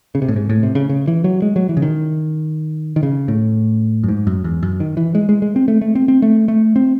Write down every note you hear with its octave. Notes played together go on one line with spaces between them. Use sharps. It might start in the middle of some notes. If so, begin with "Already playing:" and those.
C#3
C3
A2
G#2
A2
C3
C#3
C#3
E3
F#3
G#3
F#3
E3
C#3
D#3
D#3
C#3
A2
F#2
G#2
F#2
E2
F#2
D#3
E3
G#3
G#3
G#3
C4
A3
A3
C4
C4
A3
A3
C4